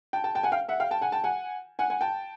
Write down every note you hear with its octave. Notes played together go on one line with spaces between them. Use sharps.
G5 A5
G5 A5
G5 A5
F#5 G#5
F5 G5
E5 F#5
F5 G5
G5 A5
F#5 G#5
G5 A5
F#5 G#5
F#5 G#5
F#5 G#5
G5 A5